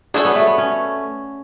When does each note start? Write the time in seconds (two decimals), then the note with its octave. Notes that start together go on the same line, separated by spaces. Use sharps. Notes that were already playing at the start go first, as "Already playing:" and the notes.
0.14 D4 F#4 G#4 A4 C#5
0.25 B3
0.36 A3
0.47 B3
0.58 C#4